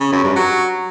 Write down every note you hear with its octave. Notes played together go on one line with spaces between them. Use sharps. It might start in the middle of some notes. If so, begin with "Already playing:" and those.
C#3
F#2
G2
F#3